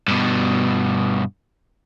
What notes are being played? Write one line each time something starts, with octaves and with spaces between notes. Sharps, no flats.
G2 B2